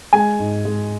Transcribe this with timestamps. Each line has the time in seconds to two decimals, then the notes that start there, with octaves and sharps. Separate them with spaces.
0.13 G#3 G#5
0.40 G#2
0.65 G#3